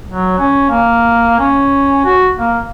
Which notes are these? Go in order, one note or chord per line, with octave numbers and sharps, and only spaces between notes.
F#3
C#4
A#3
C#4
F#4
A#3